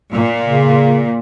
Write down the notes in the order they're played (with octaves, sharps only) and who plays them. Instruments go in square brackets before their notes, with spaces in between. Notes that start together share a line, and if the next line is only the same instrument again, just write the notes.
[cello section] A#2
[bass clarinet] C#3